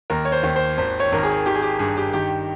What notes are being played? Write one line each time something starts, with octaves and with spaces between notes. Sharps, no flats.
D#2 A#4
C#5
C5
D#2
C5
G#1 C5
C#5
G#1 A#4
G#4
D#3 G4
G#4
G4
G2 G#4
G4
D#3 G4